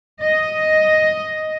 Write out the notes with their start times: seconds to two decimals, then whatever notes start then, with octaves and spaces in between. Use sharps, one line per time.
0.21 D#5